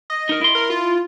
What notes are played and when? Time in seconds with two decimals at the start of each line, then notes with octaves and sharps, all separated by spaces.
0.10 D#5
0.29 D#4 A#4
0.41 E4 C6
0.55 A#4
0.70 F4